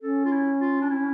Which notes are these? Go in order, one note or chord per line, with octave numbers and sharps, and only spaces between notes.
C#4 A4
F4
E4
F4
D4
E4